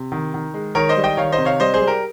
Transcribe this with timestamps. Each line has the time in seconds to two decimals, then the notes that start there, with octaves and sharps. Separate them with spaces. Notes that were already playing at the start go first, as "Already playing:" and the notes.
Already playing: C3
0.12 D#3
0.34 D#3
0.54 G#3
0.75 D#3 A#4 C#5
0.89 C5 D#5
0.97 G3
1.04 D#5 G5
1.17 D#3 C#5 F5
1.32 C5 D#5
1.38 C3
1.45 C#5 F5
1.60 G3 C5 D#5
1.74 G#4 C5
1.81 G3
1.87 G4 A#4